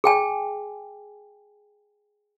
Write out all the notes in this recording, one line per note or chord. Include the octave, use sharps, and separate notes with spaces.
G#4 G5 G#5